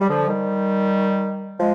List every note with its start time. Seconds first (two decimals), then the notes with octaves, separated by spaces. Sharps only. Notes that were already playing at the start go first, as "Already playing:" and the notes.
0.01 G3
0.09 D3 F3
0.27 D#3 G3
1.59 F3 G#3